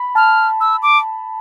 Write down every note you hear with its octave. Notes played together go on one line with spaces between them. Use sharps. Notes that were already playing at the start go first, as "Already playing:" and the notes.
Already playing: B5
A5 F6
E6
D6